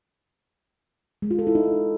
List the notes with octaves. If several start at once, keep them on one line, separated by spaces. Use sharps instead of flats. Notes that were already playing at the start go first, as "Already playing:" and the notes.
G#3
F4
A4
E4
D#4